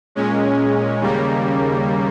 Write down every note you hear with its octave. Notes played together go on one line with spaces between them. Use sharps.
A#2 G#3 C#4
D#2 C#3 G3 A#3